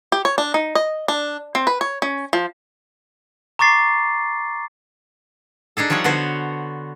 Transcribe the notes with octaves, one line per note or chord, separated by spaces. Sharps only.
G4
C#5
D4
D#4
D#5
D4
C4
B4
C#5
C#4
F3
A#5 C#6 D6 A6 C7
D4 D#4 G#4 A4
F3 G3 D#4 C#5 F#5
D3 B3 F#4 C5 C#5